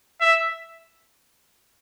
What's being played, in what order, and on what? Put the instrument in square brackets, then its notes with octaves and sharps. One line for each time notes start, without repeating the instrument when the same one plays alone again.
[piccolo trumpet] E5